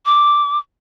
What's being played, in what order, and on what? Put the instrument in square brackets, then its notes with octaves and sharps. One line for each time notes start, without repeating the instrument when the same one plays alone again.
[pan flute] D6